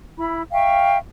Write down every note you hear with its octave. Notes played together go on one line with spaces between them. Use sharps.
E4 B5
E5 F5 G5 C#6